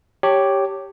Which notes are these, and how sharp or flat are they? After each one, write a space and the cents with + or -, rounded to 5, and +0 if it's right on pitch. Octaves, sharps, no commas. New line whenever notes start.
G4 +0 C#5 +0 A5 +20